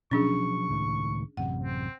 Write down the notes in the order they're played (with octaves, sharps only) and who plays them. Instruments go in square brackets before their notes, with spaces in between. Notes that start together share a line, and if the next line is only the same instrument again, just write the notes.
[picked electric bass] B2 F3 F#3 [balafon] C#4 D4 G#4 [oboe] C#6
[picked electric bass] C#2 A2 D#3
[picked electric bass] A1 F#2 C3 [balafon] F#5
[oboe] C4